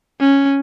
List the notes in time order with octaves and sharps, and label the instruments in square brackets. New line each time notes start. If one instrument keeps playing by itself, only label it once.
[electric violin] C#4